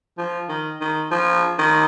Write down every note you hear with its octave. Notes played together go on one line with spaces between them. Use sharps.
F3
D#3
D#3
F3
D#3